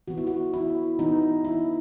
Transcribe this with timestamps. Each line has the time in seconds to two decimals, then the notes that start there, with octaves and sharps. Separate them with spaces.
0.08 E3 B3 F#4
0.18 E4
0.27 F#4
0.54 E4
0.99 E3 B3 D#4
1.45 E4